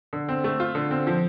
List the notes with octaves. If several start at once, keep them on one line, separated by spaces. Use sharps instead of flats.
D3
C4
A3
F4
D3
C4
F3